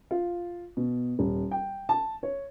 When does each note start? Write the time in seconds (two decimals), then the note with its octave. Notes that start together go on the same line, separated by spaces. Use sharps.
0.11 F4
0.77 B2
1.19 D#1
1.51 G5
1.89 A5
2.23 C#5